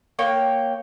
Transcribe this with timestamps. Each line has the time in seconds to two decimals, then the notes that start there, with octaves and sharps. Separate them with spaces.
0.19 A#3 C#5 G5